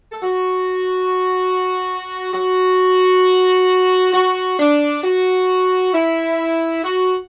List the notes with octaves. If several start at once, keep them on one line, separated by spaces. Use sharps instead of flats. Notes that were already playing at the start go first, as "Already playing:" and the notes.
A4
F#4
F#4
F#4
D4
F#4
E4
F#4